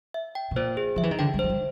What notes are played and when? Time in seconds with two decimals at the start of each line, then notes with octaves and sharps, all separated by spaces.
0.14 E5
0.35 G5
0.51 B2
0.56 A#2 C5
0.77 G#4
0.96 F3 E5
1.03 E3
1.11 D#3
1.19 D3 G5
1.34 G3
1.39 F#3 C5
1.49 G3